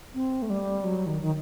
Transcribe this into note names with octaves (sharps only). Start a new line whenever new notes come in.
C4
A3
G3
F#3
D#3
D#3